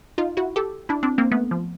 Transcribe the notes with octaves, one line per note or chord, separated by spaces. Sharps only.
D#4 F4
E4 F#4
G4 A4
D4 E4
C4 D4
A#3 C4
A3 B3
F3